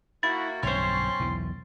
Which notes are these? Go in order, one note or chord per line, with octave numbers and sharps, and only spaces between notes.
A#3 E4 F#4 A6
B1 G2 D3 C#4 C5 C#5 G5 C6
B1 E2 E3